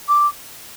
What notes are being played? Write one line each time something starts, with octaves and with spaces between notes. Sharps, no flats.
D6